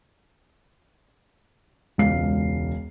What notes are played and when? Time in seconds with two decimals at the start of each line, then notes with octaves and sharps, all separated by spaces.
1.98 E1 C#2 F5 C7